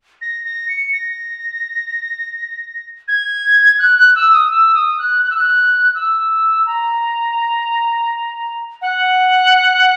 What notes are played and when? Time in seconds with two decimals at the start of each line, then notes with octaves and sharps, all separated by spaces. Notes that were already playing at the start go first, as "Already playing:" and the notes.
0.21 A#6
0.44 A#6
0.69 C#7
0.93 A#6
3.08 G#6
3.79 F#6
3.97 F#6
4.15 E6
4.33 D#6
4.51 E6
4.74 D#6
4.99 F#6
5.23 F#6
5.30 E6
5.36 F#6
5.95 E6
6.66 A#5
8.82 F#5